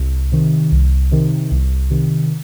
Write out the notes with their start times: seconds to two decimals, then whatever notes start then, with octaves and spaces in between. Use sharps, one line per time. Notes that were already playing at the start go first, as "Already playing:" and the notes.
Already playing: C2
0.32 C3 D#3
0.72 C2
1.11 C3 D#3
1.51 C2
1.91 C3 D#3